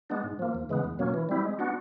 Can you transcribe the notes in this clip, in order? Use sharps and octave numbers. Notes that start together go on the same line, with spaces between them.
G#3 B3 D4
G#2
F3 A#3
D#2
C#3 E3 G#3 B3
E2
B2 F#3 A#3 C#4
E3
G3 C4 E4
G#3
B3 D4 F#4